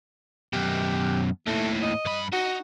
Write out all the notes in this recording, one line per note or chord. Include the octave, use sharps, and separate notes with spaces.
F#2 B2 G4
D#2 A2 A3
D#5
G2 B5
D#4 F#4